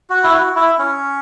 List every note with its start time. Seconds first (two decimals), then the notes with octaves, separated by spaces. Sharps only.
0.10 F#4
0.23 E4
0.33 F#4
0.56 E4
0.79 C#4